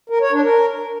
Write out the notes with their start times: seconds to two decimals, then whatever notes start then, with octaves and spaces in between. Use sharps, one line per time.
0.10 A#4
0.21 C#5
0.32 D4
0.43 A#4